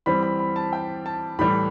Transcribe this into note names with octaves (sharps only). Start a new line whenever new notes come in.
E3 G3 C4 B5
B5
B5
A5
G5
A5
A2 E3 G3 B5